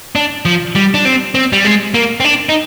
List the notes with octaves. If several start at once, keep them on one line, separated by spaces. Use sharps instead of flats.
D4
F3
G3
D4
C4
C4
G3
G#3
A#3
C4
D4
D#4